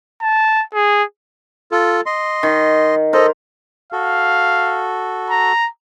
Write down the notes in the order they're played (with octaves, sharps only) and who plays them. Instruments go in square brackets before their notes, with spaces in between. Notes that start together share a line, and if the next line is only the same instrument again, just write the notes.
[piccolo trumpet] A5
G#4
[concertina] F4 A4
D#5 C6
[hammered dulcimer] D#3
[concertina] A4 D#5 [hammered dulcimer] A#4 C5
[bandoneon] F#4 A4 [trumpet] F5
[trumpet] A#5